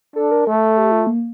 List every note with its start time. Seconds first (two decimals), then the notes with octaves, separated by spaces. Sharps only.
0.16 D4 A4
0.31 A#4
0.47 A3 A4
0.78 G4
0.92 F4
1.07 A#3